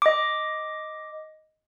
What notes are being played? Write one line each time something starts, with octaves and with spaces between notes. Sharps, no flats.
D#5 D6